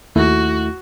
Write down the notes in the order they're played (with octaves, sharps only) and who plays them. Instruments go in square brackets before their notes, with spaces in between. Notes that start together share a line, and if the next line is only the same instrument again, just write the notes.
[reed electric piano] D#2 A3 E4 [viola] F#4